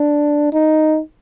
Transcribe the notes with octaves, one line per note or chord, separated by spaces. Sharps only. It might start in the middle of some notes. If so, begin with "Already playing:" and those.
Already playing: D4
D#4